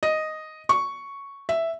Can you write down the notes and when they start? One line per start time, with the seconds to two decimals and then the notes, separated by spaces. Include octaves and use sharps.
0.03 D#5
0.69 C#6
1.49 E5